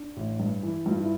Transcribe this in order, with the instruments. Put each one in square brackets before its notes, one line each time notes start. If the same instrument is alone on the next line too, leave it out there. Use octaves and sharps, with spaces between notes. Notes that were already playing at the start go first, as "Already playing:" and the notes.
Already playing: [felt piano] D4
[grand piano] A1
G2
E3
[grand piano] G2 [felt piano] F4
[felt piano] E4